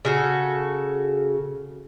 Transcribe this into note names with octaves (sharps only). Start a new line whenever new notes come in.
C#3 F#4 A4